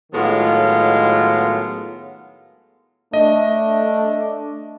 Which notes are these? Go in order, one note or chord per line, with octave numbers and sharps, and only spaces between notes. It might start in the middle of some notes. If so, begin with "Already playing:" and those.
A2 D#3 F#3 G#3 B3 F4
A3 D4 D#5